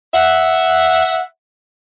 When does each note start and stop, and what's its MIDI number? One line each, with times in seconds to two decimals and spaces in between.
0.14 1.24 76
0.14 1.24 78